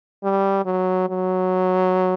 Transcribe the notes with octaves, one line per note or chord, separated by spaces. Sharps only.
G3
F#3
F#3